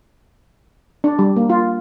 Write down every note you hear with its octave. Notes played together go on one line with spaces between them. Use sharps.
D4
G3
A#3
F4